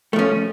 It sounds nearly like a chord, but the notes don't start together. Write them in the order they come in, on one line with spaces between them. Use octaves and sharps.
A3 F3 C#4